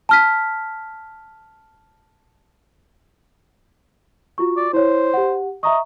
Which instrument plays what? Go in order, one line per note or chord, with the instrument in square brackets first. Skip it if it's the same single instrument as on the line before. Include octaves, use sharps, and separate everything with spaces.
[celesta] A5 F6 B6
F4 F#4 C#6
[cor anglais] D5
[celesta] E4 C#5 [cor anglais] C5
[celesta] G4 F#5
[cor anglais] D#5 [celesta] E5 A#5 C#6